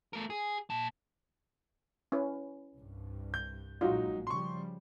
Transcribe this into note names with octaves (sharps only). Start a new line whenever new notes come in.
A3 A#4
G#4
A#2 A5
C#4 E4 B4
C2 G2
G6
A#1 F#3 G#3 D#4 F4 F#4
C#3 F3 G3 C6 C#6